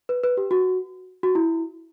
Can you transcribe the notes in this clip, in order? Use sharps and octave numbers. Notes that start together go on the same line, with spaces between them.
B4
B4
G4
F#4
F#4
E4